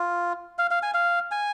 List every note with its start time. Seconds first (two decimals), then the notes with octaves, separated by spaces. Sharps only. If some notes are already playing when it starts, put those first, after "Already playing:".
Already playing: F4
0.58 F5
0.71 F5
0.83 G#5
0.94 F5
1.31 G#5